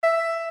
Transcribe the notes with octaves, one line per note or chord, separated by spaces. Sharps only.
E5